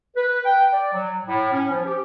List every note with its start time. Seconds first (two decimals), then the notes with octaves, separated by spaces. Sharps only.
0.16 B4
0.46 G5
0.73 D5
0.93 F#3
1.26 A2
1.52 C#4
1.71 F3
1.86 G4